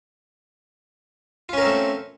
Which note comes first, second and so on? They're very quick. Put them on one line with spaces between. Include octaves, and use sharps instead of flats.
F4 C#4 A#4 C4 A3